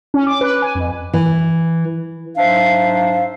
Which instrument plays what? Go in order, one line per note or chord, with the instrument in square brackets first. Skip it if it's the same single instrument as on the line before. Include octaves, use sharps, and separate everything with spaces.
[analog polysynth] C#4
D6
B4
G#5
F2
[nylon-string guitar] E3
[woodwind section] G#2 F#3 D4 C5 E5 F5